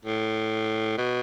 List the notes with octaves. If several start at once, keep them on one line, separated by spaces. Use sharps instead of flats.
A2
B2